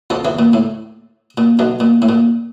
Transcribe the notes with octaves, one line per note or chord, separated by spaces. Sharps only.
F2 F3
E2 E3
A#2
A2
A#2
B1 B2
A#2
A2
A#2